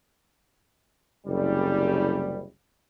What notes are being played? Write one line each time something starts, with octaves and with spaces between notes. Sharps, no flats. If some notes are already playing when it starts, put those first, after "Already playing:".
F#1 C2 G3